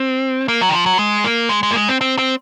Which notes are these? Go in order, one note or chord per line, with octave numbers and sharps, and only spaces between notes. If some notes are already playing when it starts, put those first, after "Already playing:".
Already playing: C4
A#3
F#3
D#3
F3
F#3
G#3
A#3
G#3
G#3
A#3
G#3
C4
C4
C4